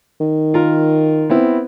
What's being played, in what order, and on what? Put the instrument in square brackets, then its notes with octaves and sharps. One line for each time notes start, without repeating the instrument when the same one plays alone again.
[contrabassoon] D#3
[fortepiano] F4 A#4
B3 C4 E4